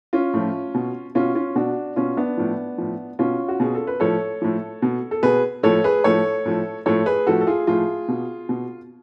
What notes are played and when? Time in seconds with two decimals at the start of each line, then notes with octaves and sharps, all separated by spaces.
0.13 C#4 F4
0.34 A2 F3
0.74 B2
1.15 B2 C#4 F4
1.35 C#4 F4
1.55 B2 D4 F#4
1.96 B2 C#4 F4
2.17 B3 D4
2.37 A2 F3
2.78 A2 F3
3.19 B2 C#4 F4
3.48 F#4
3.60 B2 G#4
3.75 A4
3.87 B4
4.00 A2 F3 A4 C#5
4.42 A2 F3
4.82 B2
5.11 A4
5.23 B2 G#4 B4
5.63 A2 F3 A4 C#5
5.84 G#4 B4
6.04 A2 F3 A4 C#5
6.45 A2 F3
6.86 A2 F3 A4 C#5
7.06 G#4 B4
7.27 A2 F3 F#4 A4
7.41 A4
7.47 F4 G#4
7.67 A2 F3 F4 G#4
8.08 B2
8.49 B2